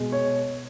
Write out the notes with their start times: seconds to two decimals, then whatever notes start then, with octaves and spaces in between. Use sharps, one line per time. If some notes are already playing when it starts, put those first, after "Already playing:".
Already playing: B2 G#3
0.12 C#5